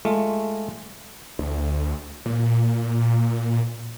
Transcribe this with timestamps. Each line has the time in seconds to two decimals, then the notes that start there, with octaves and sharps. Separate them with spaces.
0.05 G#3 A3 F4
1.39 D2
2.26 A#2